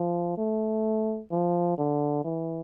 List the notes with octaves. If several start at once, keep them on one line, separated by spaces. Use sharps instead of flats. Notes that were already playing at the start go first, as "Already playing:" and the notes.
Already playing: F3
A3
F3
D3
E3